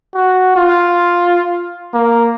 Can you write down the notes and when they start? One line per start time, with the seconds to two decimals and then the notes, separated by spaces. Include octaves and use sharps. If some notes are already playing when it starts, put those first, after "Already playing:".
0.14 F#4
0.56 F4
1.94 A#3